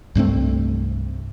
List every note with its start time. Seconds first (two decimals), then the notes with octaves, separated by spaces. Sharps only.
0.15 C2 G2 A3 C4